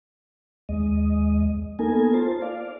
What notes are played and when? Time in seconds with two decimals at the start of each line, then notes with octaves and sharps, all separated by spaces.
0.69 D#2 G#3 D#5
1.79 A#3 B3 D#4 A4 A#4 G#5
2.14 F4 C5 A5
2.42 D5 F5